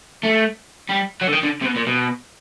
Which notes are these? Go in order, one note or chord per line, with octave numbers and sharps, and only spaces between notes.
A3
G3
F#3
D3
D#3
D3
C3
B2
A#2
B2